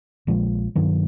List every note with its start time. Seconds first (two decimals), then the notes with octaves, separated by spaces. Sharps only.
0.27 A#1 A#2 F3 G#3
0.75 G2 D#3 F#3